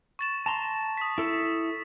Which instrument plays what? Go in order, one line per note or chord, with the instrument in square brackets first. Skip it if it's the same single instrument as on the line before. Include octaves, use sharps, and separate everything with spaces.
[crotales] C#6 A6 E7
[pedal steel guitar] A5 A#5 C6
[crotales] D#6 B6
[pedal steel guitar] E4 A4